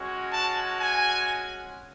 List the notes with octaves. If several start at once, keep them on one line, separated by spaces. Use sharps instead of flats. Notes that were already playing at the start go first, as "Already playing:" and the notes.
Already playing: G#3 C#4 F#4
A5
G#5